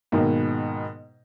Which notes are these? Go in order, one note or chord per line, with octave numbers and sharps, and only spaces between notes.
G#2 B2 D#3 A#3 B3